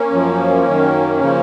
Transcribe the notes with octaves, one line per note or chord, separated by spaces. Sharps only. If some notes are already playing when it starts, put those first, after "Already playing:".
Already playing: A#3 C#4
F#2 F3
F#2 D#3
C#3 F3